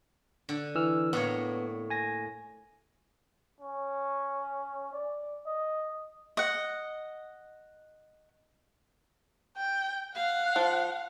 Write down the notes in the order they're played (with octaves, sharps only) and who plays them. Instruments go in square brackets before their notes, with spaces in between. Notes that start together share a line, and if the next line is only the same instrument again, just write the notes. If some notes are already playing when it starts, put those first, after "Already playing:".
[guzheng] D3
[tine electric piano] E3 E6 F6
[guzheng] A2 A#3 C#5 [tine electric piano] B3
[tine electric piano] G#5 A#6
[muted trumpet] C#4
D5
D#5
[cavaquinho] D#5 F#5
[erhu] G5
[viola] F5 [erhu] F#5
[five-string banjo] F3